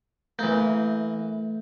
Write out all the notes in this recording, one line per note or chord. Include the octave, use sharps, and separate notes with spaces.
E3 A3 A#3 G6